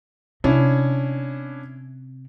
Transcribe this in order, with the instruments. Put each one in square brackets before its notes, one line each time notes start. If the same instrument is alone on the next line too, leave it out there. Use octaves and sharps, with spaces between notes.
[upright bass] C3 [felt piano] C#4 D4 E4